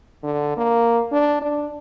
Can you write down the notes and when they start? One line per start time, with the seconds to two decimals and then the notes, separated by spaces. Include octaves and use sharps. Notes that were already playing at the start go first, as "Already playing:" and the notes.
0.24 D3
0.57 A#3
1.12 D4
1.42 D4